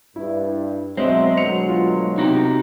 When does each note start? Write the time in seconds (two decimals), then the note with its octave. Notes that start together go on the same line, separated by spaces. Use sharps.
0.16 G2 E4
0.97 B2 F#3 G#3 C4 D#5 E5
1.37 D2 B2 F#3 C#7 F7
1.69 F4
2.18 C3 D#4 F#4 G4